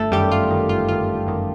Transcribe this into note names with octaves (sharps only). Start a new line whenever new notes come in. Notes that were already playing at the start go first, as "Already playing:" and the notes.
Already playing: G1 A3 A4
F#2 D#3 G3 G4
G1 F4
F#2 D#3
G1 F4
F#2 D#3 F4
G1
F#2 D#3